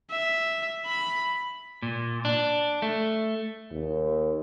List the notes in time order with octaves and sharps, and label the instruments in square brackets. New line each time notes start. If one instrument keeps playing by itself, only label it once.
[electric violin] E5
B5
[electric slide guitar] A#2
D4
A3
[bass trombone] D#2